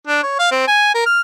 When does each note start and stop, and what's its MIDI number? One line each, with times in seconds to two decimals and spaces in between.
0.07 0.21 62
0.23 0.37 73
0.39 0.48 77
0.51 0.64 60
0.68 0.90 80
0.94 1.06 70
1.06 1.21 89